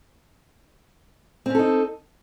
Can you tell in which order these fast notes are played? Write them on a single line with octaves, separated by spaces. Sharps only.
C4 C#4 A4 D#4